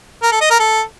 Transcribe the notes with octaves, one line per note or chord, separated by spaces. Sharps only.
A#4
A4
D#5
A#4
A4